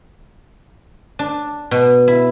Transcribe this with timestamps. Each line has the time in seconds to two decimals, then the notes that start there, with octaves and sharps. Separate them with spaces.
1.19 D4
1.71 B2
2.08 E4